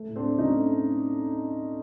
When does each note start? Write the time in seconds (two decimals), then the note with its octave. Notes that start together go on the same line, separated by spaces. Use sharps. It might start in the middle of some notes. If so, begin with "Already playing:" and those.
Already playing: A3
0.08 A2
0.16 C4 D4
0.23 A3
0.38 A2 C#4 D#4
0.54 A3
0.69 A3